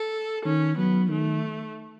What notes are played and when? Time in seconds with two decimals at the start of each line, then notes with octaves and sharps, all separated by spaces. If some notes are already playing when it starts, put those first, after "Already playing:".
Already playing: A4
0.45 D#3 C#4
0.77 F#3 B3
1.10 D#3 A3